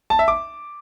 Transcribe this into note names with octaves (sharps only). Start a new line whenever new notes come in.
A5
E5
D6